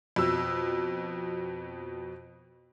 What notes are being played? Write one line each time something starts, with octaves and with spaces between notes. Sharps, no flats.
F2 B2 E6